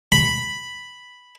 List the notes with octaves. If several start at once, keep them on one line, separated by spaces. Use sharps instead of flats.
B5